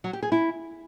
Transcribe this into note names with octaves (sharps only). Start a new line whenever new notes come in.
F#3
G4
G#4
E4